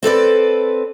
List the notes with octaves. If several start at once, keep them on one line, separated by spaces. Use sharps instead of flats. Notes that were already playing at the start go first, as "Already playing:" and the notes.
C4 A4 B4 D5